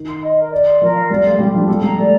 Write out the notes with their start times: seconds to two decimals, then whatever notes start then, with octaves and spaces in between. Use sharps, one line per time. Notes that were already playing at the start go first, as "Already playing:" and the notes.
Already playing: D#3
0.09 C6
0.23 D#5
0.37 A#4
0.52 D5
0.66 C6
0.81 F3 A#4
0.95 F5
1.10 G3 D5
1.24 A3 C6
1.39 G3 G4
1.54 F3 D4
1.68 G3 A4
1.82 G3 A#5
1.97 A3 D5